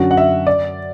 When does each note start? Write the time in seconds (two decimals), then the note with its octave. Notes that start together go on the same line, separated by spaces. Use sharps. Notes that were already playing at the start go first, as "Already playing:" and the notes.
Already playing: F#2 D3 F#3 F#4
0.11 F#5
0.17 E5
0.47 D5